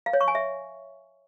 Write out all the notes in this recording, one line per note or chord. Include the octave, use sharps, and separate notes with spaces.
F5
C#5
C#6
G#5
E5